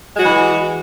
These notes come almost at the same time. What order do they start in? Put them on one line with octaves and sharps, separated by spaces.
G#3 F#4 E3